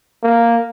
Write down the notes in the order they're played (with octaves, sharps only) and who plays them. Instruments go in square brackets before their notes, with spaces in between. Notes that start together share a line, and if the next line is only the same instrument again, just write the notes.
[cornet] A#3